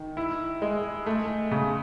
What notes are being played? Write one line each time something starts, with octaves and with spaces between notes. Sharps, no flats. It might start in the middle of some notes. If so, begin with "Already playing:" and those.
Already playing: D#3
E4
G#3
A3
C#3